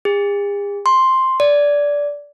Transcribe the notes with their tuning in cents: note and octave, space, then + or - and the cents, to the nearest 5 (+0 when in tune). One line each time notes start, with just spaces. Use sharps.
G#4 -45
C6 +5
D5 -15